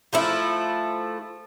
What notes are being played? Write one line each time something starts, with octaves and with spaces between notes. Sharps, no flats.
F3 A3 E4